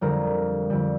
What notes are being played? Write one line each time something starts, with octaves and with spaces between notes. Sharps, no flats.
F2 D3 G3 A#4
F2 D3 G3